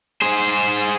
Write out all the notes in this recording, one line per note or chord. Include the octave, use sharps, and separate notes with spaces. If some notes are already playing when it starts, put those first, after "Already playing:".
G#4 C5